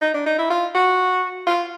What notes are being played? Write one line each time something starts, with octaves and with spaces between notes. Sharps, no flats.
D#4
D4
D#4
E4
F4
F#4
F4